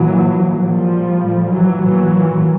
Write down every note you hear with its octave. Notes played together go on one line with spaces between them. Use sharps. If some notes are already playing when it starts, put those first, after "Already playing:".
Already playing: A#2 E3 F#3
A#2 F3 G3
A2
E3 F#3
A#2 E3 F#3